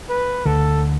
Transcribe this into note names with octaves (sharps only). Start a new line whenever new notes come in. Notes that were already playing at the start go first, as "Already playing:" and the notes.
B4
D2 D3 A4